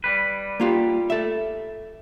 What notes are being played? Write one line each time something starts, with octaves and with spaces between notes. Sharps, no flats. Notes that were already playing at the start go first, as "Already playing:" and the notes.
G3 B4
A#3 F4 G4
A4 E5